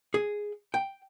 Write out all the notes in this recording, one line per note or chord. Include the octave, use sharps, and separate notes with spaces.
G#4
G5